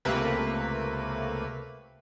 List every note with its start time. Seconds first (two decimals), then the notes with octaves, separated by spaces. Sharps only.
0.05 C#2 C3 A3 A#3 B4